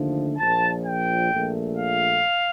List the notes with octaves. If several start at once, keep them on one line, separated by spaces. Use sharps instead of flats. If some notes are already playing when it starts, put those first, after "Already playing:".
Already playing: D#2 D3 F3 A3
A#1 A#2 F3 A5
G5
A#1 A#2 A3
F5